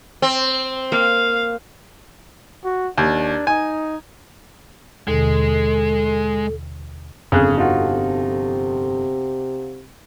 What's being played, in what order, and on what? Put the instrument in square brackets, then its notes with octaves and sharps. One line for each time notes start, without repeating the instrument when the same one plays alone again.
[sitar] C4
[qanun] A#3 [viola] F5
[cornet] F#4
[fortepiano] D#2 [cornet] D4
[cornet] D#4 [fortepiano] G#5
[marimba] D#2 B2 D3 [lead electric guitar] G#3 [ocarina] A4
[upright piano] G1 F2 [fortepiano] C#3 G#4 F#6
[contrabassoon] C3 [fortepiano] D#4 F4 F#4